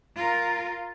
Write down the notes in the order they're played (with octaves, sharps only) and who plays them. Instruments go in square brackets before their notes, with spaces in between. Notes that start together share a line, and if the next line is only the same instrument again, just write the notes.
[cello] F4 A#4